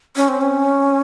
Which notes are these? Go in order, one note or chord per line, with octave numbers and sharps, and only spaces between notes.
C#4
C4
C#4